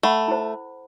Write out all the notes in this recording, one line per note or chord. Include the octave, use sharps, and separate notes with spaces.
A3 F#5 B5
E4 C5